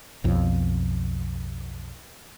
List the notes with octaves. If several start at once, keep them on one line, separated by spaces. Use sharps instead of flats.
B1 F2